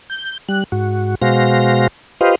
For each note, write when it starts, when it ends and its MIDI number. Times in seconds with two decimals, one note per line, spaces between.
0.10 0.38 91
0.49 0.64 55
0.49 0.64 90
0.72 1.15 44
0.72 1.15 66
1.22 1.87 47
1.22 1.87 56
1.22 1.87 66
1.22 1.87 72
1.22 1.87 77
1.22 1.87 94
2.21 2.35 65
2.21 2.35 67
2.21 2.35 71
2.21 2.35 72
2.21 2.35 75
2.21 2.35 77